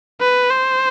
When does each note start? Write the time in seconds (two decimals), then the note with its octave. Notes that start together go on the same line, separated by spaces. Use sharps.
0.20 B4
0.50 C5